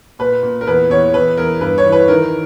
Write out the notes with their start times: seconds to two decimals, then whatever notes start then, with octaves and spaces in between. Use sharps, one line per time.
0.19 A#2 B4
0.43 A#2
0.61 A#4
0.67 E2 B4
0.90 E2 C#5
1.14 E2 B4
1.37 E2 A#4
1.61 G2 B4
1.78 C#5
1.86 E3
1.92 B4
2.08 D#3 A#4